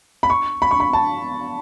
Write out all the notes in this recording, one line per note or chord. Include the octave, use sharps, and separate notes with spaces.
B5
C#6
B5
C#6
B5
A5